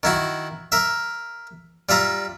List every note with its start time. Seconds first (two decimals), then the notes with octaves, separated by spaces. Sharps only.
0.03 D#3 E4 F#4
0.72 A#4 E5
1.89 G3 F4 E5 A#5